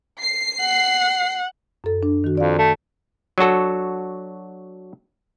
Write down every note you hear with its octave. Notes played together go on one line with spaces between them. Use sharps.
C7
F#5
F#2 A4
D4
D#3 F#4
F2 D5 F5
A3
F#3 D4 F#4 A4